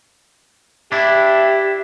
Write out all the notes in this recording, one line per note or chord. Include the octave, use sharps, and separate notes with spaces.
D4 E4 G4 E5